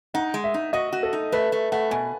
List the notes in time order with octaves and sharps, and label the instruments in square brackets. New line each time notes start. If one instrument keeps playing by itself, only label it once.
[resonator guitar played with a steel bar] D#4 [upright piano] F#5
[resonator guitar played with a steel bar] G#3
[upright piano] E5
[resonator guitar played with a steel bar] D#4
[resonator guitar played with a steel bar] F#4 [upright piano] D#5
[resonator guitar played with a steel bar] F#4
[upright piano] A4
[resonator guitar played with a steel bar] D#4
[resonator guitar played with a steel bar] A3 [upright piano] B4
[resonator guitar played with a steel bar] A3
[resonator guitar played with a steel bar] A3 [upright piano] F#5
[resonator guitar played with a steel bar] B2 [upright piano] G#5